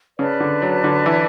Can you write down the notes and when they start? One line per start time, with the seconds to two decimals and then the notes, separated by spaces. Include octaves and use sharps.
0.19 C#3 B4 D5 A5
0.40 D3
0.62 F#3
0.84 D3
1.06 E3